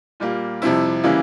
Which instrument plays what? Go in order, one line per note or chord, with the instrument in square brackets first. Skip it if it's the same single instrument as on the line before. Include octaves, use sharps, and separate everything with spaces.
[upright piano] A#2 G3 A#3
F2 C3 G3 C4 E4
C#3 E3 G3 A#3 E4